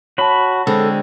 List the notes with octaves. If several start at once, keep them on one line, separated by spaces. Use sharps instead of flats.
F#4 C#5 A5 B5
D3 G#3 C4 A4